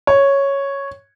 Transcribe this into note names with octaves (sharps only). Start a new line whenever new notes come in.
C#5